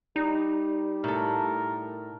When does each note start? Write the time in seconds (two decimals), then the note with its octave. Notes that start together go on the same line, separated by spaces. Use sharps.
0.16 G3 D#4
1.04 A2 A4 A#4